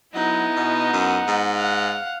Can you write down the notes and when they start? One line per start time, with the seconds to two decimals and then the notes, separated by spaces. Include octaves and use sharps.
0.15 F#3 B3 D#4 E4
0.56 B2
0.93 F#2 F#5
1.28 G#2
1.57 F5 F#5